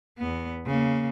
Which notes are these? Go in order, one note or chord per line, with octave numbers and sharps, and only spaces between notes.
E2 B3
C#3 A#3